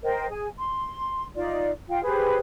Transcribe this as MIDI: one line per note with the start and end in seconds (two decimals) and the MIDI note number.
0.03 0.27 70
0.03 0.27 72
0.03 0.27 75
0.03 0.27 79
0.29 0.48 68
0.29 0.48 80
0.57 1.25 84
1.35 1.70 63
1.35 1.70 65
1.35 1.70 74
1.89 2.01 65
1.89 2.01 77
1.89 2.01 79
2.03 2.39 67
2.03 2.39 68
2.03 2.39 71
2.03 2.39 72